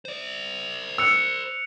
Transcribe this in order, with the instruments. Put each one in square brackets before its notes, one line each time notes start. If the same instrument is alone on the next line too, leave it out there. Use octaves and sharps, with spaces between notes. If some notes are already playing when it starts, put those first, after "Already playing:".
[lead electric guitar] C5 D5
[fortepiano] E6 [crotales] F#6 C#7 F7